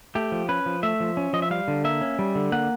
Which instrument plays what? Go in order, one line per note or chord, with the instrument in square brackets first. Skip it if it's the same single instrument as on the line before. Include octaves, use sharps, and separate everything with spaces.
[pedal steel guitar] A3 G4
F3
C#4 B4
F3
A3 E5
F3
C#4
F3 D#5
E5
G3 F5
D3
A#3 E5
C#4
G3
D3
A#3 F#5